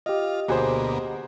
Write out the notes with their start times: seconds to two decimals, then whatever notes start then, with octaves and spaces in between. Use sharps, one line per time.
0.06 F4 G4 D#5
0.48 D2 B2 A#3 F#4 G#4 C5